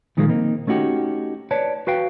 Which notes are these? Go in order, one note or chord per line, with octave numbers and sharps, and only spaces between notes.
A#2 D#3 F3 G3 G#3 A#3
A#3 C4 D#4
A3 C#4 D#4 F#4 G4
B4 C#5 D5 A5
F#4 B4 F5 G5